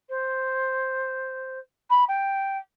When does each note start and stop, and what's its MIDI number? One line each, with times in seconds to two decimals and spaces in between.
0.09 1.59 72
1.90 2.04 83
2.08 2.58 79